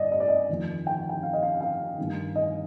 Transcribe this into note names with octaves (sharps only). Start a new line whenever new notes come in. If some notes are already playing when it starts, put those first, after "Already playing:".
Already playing: G2 D5 D#5
D#5
D5
D#5
F2 D#3
G5
G5
F5
D#5
F5
F5
G2 D#3
D#5